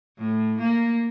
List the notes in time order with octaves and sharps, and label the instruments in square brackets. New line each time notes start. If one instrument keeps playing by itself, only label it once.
[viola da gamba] A2
A#3